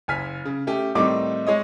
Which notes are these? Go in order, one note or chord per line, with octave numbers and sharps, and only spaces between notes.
F#1 G#5 F6 B6
C#3
A3 C#4 G4
A2 D#3 G3 C4 D#4 D6
G#3 C#5 D#5